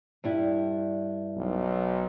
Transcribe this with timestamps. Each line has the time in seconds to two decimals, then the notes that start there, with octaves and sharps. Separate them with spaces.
0.24 G2 G3 E4
1.37 B1